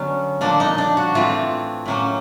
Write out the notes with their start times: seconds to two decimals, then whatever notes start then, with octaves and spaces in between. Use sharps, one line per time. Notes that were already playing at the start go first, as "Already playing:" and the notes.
Already playing: D3 F#3 B3 C#4
0.41 A#2 F3 A#3 D4
0.60 D#4
0.78 D4
0.97 F#4
1.14 A2 E3 A3 C4 F4
1.86 A2 F#3 A#3 C#4